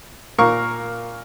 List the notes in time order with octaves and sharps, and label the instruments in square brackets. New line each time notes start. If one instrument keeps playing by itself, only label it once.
[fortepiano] A#2 A#4 F5 C#6